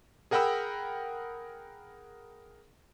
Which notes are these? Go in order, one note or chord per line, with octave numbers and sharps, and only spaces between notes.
G#4 A#4 F#5 G5 B5 E6